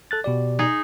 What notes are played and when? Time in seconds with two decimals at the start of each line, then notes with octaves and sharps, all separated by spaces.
0.11 A4 F#6 A6
0.24 B2 G4 D5
0.59 D#4 G#4